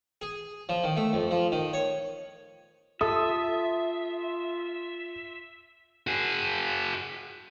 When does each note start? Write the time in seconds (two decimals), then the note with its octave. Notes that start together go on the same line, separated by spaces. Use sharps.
0.21 G#4
0.69 F3
0.84 D#3
0.97 A3
1.13 F2
1.31 F3
1.52 D#3
1.73 C#5
3.01 F4 A4 E5 D#6
6.07 F#4 G#4